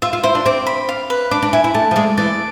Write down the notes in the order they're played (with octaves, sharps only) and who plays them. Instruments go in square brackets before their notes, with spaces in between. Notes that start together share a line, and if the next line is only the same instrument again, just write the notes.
[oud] F4 [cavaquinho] E5
[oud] F4
[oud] E4 [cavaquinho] C5
[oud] D4
[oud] C4 [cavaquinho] D6
[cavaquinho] B5
F5
B4
[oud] D4 [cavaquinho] D6
[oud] D4
[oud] E4 [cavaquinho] G#5
[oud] E4
[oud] A3 [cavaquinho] A5
[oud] F3
[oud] G#3 [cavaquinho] D5
[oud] E3 [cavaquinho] D5